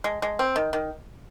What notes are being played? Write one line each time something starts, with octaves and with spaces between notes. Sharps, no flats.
G#3
G#3
C4
D#3
D#3